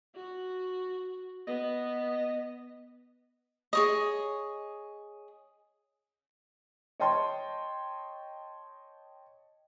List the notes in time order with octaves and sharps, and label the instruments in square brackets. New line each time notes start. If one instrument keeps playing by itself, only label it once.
[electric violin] F#4
[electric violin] B3 [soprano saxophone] D#5
[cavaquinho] G#4 C#5 D#5
[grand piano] C#5 D#5 G5 A5 C6